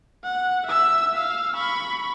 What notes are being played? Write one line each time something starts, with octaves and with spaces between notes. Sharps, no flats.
F#5
E5 E6
F5 E6
B5 C#6